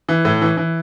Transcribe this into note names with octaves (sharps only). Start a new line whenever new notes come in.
E3
A2
E3
E3